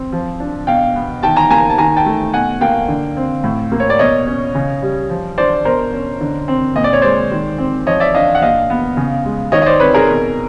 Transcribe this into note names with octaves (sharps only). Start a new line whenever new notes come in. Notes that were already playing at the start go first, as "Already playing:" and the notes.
Already playing: C4
F3
D4
B2 F5 G5
B3
D#3 G5 A5
G#5 A#5
A#3 G#5 A#5
A5
D#3 G#5 A#5
G5 A5
A3
B2 F#5 G#5
A#3 F5 G5
D3
C4
A2
A#3
C#5
D5
B2 C#5 D#5
C#4
C#3
G3
F3
D4 C5 D5
B2 A#4 C5
C#4
D3
C4
A#2 D#5
D5
C#5
G#3 C5 D5
D#3
C4
F3 C#5 D#5
D5 E5
D4 D#5 F5
F#5
A#2 D#5 F5
B3
C#3
G#3
D#3 C#5 D#5
D#5
C5 D5
C4 B4 C#5
G#4 A#4
B2